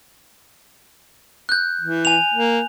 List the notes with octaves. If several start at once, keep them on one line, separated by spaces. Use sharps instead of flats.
F#6 G6
E3
G#5 F7
A#3